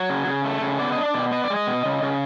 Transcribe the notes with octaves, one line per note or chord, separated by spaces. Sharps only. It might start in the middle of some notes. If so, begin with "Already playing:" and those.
Already playing: F#3 C#5
C#3
C#3
A3
C#3
B3 D5
D4 D#5
D5
B2
B3 D#5
D5
G#3
D#5
B2
C#3
C#3